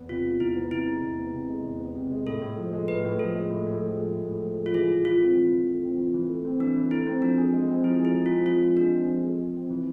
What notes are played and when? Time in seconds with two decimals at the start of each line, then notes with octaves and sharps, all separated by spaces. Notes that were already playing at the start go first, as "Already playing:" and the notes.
Already playing: E2 B3
0.09 C3 F4
0.24 G#3
0.40 E2 E4
0.56 B3
0.71 C3 E4
0.86 G#3
1.03 E2
1.18 B3
1.33 C3
1.49 G#3
1.64 E2
1.80 B3
1.95 C3
2.11 G#3
2.26 A2 A4
2.41 A2
2.58 F3
2.73 G#3
2.88 A2 B4
3.04 A2
3.19 F3 A4
3.35 G#3
3.50 A2
3.66 A2
3.81 F3
3.97 G#3
4.12 A2
4.28 A2
4.44 F3
4.59 G#3
4.66 F4
4.74 E3 G#4
4.90 E3
5.05 A3 F4
5.20 C4
5.37 E3
5.52 E3
5.68 A3
5.82 C4
5.98 E3
6.14 E3
6.29 A3
6.45 C4
6.60 E3 D4
6.76 E3
6.91 A3 E4
7.06 C4
7.22 F3 D4
7.38 G#4
7.53 G#3
7.68 C4
7.84 F3 E4
8.00 G#4
8.05 E4
8.15 G#3
8.26 C4 F4
8.46 F3 F4
8.62 G#4
8.77 G#3 D4
8.92 C4
9.08 F3
9.23 G#4
9.39 G#3
9.54 C4
9.70 E3